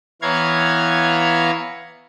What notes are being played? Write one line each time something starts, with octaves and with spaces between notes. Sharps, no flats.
E3 B3 C#5 F5 A#5 G#6